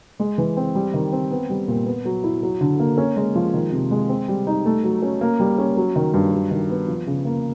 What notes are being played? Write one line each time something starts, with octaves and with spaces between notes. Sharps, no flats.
G#3
E3
C4
G3
D#3
C4
B3
G3
A#2
B3
F#3
E4
F#3
D3
A#3
C#4
G#3
F3
D#3
C3
G#3
C4
G3
D#4
A3
F#3
C#4
A#3
G3
C#4
F#3
D#3
G2
F#3
D#3
B3
F3
C#3
A#3